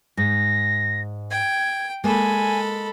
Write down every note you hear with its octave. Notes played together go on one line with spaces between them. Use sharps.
G#2 A#6
G5 G#6
G#3 A#3 A4 G#5 B5